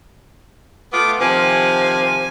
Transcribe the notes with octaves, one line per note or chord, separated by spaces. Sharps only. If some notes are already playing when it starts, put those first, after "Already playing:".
A3 B3 F4 D6
C3 D#3 F3 G#5